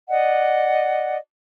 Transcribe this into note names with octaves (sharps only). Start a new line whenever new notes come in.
D5 D#5 F#5